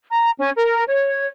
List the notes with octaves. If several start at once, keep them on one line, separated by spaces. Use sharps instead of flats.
A#5
C#4
A#4
C#5